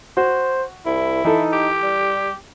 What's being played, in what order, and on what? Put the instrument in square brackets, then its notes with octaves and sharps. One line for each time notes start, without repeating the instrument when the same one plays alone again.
[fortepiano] F#4 [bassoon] C5
[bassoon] C2 [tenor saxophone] E4
[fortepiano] E3 A4 [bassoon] D#4
[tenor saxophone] G4
[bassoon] G3